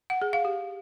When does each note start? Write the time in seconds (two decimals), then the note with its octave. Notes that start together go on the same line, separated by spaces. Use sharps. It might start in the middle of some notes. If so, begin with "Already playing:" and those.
0.10 F#5
0.22 G#4
0.33 F5
0.45 G4